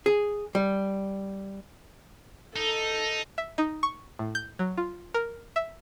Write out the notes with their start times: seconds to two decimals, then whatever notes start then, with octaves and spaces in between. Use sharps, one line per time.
0.06 G#4
0.55 G3
2.56 D#4 A4
3.38 E5
3.58 D#4
3.83 C#6
4.19 A2
4.35 G6
4.59 F#3
4.77 F4
5.14 A#4
5.56 E5